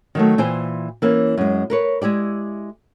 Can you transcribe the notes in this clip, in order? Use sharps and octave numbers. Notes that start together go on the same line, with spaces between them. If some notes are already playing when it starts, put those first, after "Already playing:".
D#3 F#3 A3
A#2 E3 C5 G5 G#5
E3 A#3 C#4
F#2 G#3
A#4 B4 C#5
G#3 E4 G4 D5